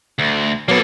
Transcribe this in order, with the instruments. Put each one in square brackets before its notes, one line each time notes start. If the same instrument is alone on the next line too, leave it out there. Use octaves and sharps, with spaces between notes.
[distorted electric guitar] D2
[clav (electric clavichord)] F#3 B3 [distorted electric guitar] A#3 A4